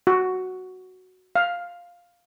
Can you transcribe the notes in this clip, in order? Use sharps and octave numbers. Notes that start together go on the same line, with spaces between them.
F#4
F5